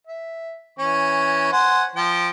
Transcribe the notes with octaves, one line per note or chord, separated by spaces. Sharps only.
E5
E3 C#4 C#6
C5 F#5 G#5
F3 G5